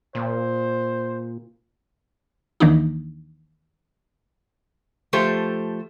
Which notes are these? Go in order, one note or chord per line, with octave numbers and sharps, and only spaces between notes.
A#2 C5
D#2 D#3 E3 A#3 D4 D#4
F3 A3 G4 A4 C5